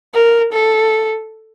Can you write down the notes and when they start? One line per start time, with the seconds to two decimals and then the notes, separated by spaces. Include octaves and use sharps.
0.14 A#4
0.53 A4